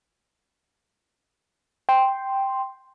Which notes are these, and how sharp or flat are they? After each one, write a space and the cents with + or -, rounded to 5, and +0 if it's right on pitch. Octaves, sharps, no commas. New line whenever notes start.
G5 +0 C6 +0